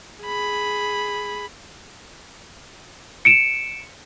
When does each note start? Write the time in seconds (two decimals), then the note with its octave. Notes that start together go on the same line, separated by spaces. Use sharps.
0.23 G#4 B5
3.25 C#7 D7 E7